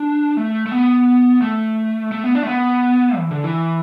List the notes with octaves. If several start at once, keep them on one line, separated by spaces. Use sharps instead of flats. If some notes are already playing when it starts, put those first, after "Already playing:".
Already playing: D4
A3
A3
B3
A3
A3
B3
D4
A3
B3
E3
D3
E3